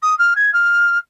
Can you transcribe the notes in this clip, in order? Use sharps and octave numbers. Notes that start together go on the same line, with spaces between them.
D#6
F6
G#6
F6